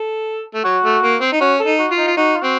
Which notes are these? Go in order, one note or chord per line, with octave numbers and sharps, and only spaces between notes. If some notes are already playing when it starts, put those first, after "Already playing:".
Already playing: A4
A3
F#3 F#4
A3
A#3
C4
D#4
C#4 F#4
A4
D#4
F#4
F4
D#4
F4
D#4 F#4
F4
C4 F#4